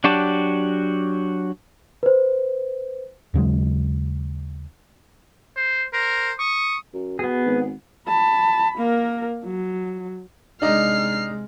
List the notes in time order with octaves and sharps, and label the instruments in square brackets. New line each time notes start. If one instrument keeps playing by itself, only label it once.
[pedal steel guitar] F#3 D4 F#4 G4 A5
[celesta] B4 C5
[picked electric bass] D#2 C#3 F#3 G#3
[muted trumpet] C5
[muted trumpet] A#4 [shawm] C5
[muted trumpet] C#6 [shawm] D#6
[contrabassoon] F#2
[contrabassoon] B2 [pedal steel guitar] B3 G#4
[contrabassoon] G#1
[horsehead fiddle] A5 B5
A#3 A#4
F#3
[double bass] C3 G#3 [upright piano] D4 D#4 D#5 [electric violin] F6 C7